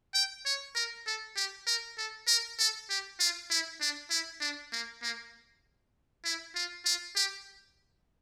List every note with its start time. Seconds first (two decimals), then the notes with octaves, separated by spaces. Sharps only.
0.14 G5
0.45 C#5
0.75 A#4
1.06 A4
1.36 G4
1.67 A#4
1.98 A4
2.27 A#4
2.58 A4
2.89 G4
3.20 F4
3.50 E4
3.81 D4
4.10 E4
4.41 D4
4.72 A#3
5.02 A#3
6.24 E4
6.55 F4
6.85 F4
7.16 G4